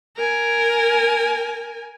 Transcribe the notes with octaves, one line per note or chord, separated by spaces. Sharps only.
A#4 G#5